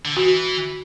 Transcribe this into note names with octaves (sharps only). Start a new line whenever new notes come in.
D3
E3 F#4